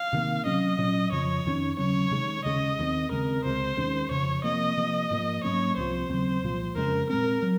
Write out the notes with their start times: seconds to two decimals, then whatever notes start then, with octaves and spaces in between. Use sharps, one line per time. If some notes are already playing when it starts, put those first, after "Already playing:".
Already playing: F5
0.13 C3 D#3 A#3
0.46 C3 F#3 C#4 D#5
0.78 A#2 F#3 C#4
1.12 F2 C#3 F3 C#5
1.45 F2 D#3 A#3 C#4
1.78 D#2 C#3 F#3 C#4 C#5
2.11 C3 D#3 G#3
2.45 D#2 C#3 G#3 C#4 D#5
2.79 D#2 D#3 F#3 C4
3.11 D#2 C#3 G#3 C4 A#4
3.45 C#2 C3 F3 C5
3.49 G#3
3.77 D#2 D#3 G#3 C#4
4.10 F2 C#3 F3 C#5
4.44 C3 F3 A#3 D#5
4.77 C3 F3 A#3
5.11 G#2 F3 A#3
5.43 G#2 F#3 A#3 C#4 C#5
5.77 C2 C3 F3 C5
6.09 D#2 C#3 F#3 C4
6.43 C2 A#2 F3
6.76 F2 C#3 G#3 A#4
7.09 A#2 G#3 C4 A#4
7.42 F#3